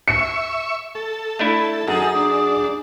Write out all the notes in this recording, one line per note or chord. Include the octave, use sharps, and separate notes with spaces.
E5 C#6 C#7
A4
A3 D4 E4
F#2 D#4 G#4
D4